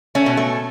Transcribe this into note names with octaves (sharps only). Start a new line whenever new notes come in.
A3 C#4
B2
A3